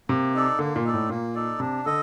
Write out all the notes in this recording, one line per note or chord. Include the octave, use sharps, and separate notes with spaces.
C3 A#3
D#4 A4 D5
D3 A#3
A#2
D#4 A4 D5
A2
A#2 A#3
D#4 A4 D5
C3 D4
D3 A4 D#5